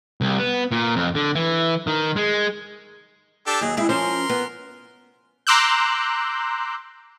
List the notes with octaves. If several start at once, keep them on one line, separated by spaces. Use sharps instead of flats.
C2
B3
A#2
F2
D3
E3
D#3
G#3
D4 G4 A4
D#2 F#3 G#4
G#3 C4 E4 G#4
F3 C#4 A#4 C5 C6
B3
A#5 C6 D6 E6 F#6 G6